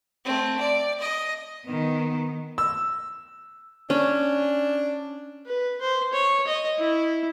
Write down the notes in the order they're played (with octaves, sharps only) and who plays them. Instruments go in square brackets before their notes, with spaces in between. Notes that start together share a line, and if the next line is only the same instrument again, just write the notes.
[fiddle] A3 C4
D5
D#5
[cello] D#3 B3
[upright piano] E6
[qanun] C#4 [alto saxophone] D4
[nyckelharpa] B4
C5
C#5
D#5
E4